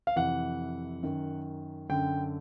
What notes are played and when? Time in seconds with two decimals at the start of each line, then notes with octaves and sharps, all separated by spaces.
0.07 F5
0.16 F2 C3 E3 F#5
1.03 F#2 D#3
1.89 F#2 D3 G5